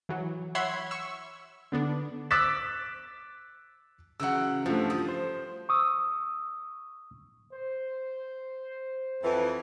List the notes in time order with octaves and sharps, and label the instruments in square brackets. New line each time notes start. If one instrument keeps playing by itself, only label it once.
[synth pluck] E3 F#3
C#5 E5 F#5 B5 C6 G#6
C#6 E6
D3 B3 D4
[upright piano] D6 E6 F#6 A6 B6 E7
[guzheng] C#3 E3 F#3 [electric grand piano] F#5 E6
[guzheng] G2 [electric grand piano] F3 A3
[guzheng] F3 [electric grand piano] D#6
[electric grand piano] C5
[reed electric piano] C#6 D#6 E6
[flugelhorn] C5
[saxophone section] F2 E3